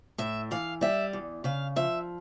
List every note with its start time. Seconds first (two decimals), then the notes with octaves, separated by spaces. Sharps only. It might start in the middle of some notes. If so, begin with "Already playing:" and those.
0.18 A2 E5
0.51 E3 F5
0.81 G3 E5
1.13 E2
1.44 C#3 F5
1.76 F3 E5